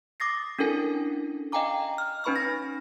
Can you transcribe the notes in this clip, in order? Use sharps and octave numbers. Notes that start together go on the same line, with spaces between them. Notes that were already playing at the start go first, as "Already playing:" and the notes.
D6 D#6 A6 A#6 C7
C#4 D4 E4 A4 A#4 G#5
D#5 F5 G5 G#5 A#5 D6
F6
C#4 D#4 B4 B5 C#6 F6
A#6